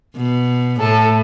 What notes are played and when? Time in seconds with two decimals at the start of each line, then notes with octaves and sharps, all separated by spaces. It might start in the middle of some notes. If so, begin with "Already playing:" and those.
0.16 B2
0.80 A2 A4